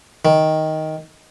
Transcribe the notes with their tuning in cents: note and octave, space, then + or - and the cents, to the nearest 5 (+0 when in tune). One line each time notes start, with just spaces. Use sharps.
D#3 +10